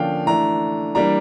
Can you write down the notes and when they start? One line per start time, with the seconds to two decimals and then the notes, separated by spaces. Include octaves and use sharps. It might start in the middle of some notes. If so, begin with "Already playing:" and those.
Already playing: D3 F3 A#3 C#4 D5 F5 G5
0.26 E3 A3 D4 A#5
0.95 E3 G3 A#3 D4 A#5